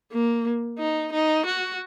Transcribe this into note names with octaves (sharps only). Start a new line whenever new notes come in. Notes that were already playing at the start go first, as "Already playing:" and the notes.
A#3
D#4
D#4
F#4